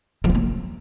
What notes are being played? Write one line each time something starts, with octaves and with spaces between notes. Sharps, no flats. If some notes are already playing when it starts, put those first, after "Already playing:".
F3
C4
A#3